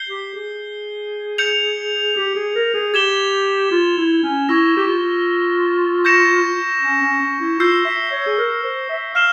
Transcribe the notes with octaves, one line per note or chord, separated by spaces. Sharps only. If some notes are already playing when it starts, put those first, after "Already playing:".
Already playing: G6 C7 G7
G4
G#4
G6 C#7 F7
G4
G#4
A#4
G#4
G4 G#6 E7 G7
F4
E4
C#4
E4 C#6 E6 A#6
G4
F4
C#6 G6 A#6 C#7 E7
C#4
C#4
C#4
E4
F4 E6 G6 C7
E5
C#5
G#4
A#4
C5
E5
F5 F6 C7 E7 G7